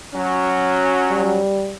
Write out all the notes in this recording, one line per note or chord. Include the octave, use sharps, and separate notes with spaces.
F#3 C#4
G3